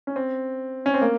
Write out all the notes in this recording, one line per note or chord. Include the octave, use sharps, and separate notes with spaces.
C#4
C4
C#4
C4
A#3